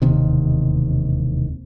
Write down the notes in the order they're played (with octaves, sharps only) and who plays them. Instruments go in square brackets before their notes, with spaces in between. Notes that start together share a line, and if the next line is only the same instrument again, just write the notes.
[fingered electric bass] E1 D#2 C3 D#3